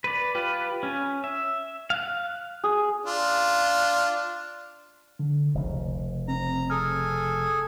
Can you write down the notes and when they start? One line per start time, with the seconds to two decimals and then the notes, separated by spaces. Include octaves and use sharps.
0.04 B4 D5
0.35 F4 G4 B4
0.83 C#4
1.24 E5
1.90 F5 F#6
2.64 G#4
3.05 D4 F4
5.19 D3
5.55 F1 C#2 C#3
6.28 C4 A#5
6.70 G#4 A4 G#5 F6